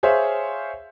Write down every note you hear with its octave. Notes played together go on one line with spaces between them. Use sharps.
G#4 C5 C#5 E5 F5